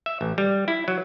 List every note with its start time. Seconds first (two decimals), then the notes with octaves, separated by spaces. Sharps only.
0.06 E5
0.21 A1
0.38 G3
0.68 E4
0.88 F#3